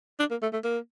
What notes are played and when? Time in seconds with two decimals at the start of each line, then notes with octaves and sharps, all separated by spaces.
0.19 D4
0.30 A#3
0.42 A3
0.53 A3
0.64 A#3